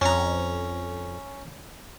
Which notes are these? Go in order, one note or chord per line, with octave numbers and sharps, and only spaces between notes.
F2 C#4 A#5